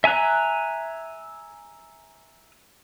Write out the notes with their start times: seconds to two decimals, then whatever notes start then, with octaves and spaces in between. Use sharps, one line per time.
0.04 E5 G#5 A#5 F#6